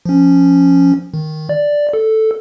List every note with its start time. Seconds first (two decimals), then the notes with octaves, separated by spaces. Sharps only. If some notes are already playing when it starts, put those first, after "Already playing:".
0.06 F3 C#4
1.14 D#3
1.49 D5
1.93 A4